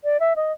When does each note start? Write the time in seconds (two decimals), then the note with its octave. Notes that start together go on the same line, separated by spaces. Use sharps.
0.04 D5
0.20 E5
0.36 D#5